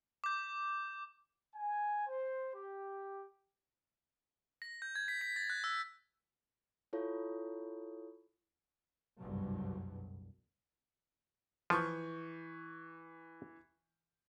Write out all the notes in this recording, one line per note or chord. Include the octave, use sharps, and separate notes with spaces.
D6 G6
G#5
C5
G4
A#6
G6
G#6
B6
B6
A6
F#6
E6
E4 F4 A4 C#5
F#1 C2 G2 B2 F#3
E3 F3 C#6 G6